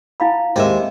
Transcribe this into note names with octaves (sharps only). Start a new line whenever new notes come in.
E4 F5 F#5 G#5 A5 B5
D#2 G#3 C4 G4 A#4 D#5 E5